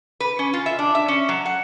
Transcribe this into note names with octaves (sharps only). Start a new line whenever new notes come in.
B4
C#4
F4
E5
D4
E5
C#4
F#3
F#5